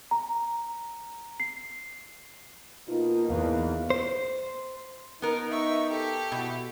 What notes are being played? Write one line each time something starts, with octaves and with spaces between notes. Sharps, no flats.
A#5
C7
B2 A#3 D#4 F4
E2 F5
C5
B3 D#4 A#4
E5 C#6
G4 A4
B2 E4 F#4 E5